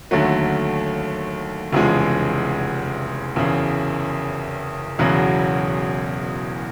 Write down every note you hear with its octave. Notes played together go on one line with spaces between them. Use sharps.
D#2 D3 F#3 A3
F1 E2 C#3 F3 G#3
F#1 E2 C#3
E1 E2 C#3 F#3 B3